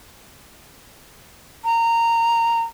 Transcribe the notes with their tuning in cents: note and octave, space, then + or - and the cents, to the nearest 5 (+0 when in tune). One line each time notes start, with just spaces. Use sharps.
A#5 -15